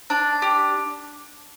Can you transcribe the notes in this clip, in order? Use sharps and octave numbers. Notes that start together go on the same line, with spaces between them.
D4
G4